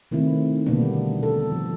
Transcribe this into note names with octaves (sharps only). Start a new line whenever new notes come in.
C3 D#3 A3 C4 E4
B2 D3 G3 A#3 B3 D4
A4
F3